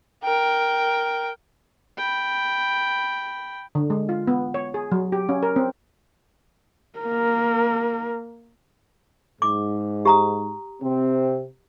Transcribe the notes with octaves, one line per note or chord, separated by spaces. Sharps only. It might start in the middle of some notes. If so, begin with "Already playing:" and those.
A#4 G5
G5 B5
D3
G#3
F4
B3
C#5
G#4
F#3
G4
C#4
A#4
C4
A#3 A#4
G#2 D6
G4 A#5 D#6
C3 C4